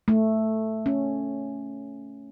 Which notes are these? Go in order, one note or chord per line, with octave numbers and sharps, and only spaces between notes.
A3
C#4